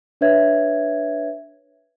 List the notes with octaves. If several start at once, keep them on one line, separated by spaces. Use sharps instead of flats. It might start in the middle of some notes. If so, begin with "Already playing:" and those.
D4 B4 C#5 E5 G#6